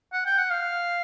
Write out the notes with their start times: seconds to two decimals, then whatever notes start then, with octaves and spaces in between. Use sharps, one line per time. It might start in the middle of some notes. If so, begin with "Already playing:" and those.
0.13 F#5
0.26 G5
0.38 F#5
0.50 F5